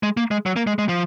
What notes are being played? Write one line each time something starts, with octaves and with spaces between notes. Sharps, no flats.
G#3
A#3
G#3
F#3
A#3
G#3
G#3
F3